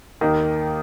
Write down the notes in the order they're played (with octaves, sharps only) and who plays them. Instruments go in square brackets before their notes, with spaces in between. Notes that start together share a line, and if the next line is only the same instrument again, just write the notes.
[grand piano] D#2 D#3 A#3 D#4